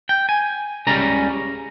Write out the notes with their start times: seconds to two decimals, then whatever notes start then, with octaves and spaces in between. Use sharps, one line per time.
0.09 G5
0.29 G#5
0.87 C#2 C#3 G3 C#4 A#5